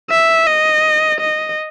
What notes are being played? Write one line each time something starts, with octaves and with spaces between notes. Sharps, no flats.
E5
D#5
D#5